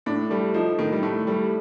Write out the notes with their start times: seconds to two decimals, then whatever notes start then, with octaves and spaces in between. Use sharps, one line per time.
0.06 A2 D4
0.30 G3 A3
0.54 F3 D#4
0.78 A2 D#3
0.92 G3
1.03 A2 A3
1.27 G3 A3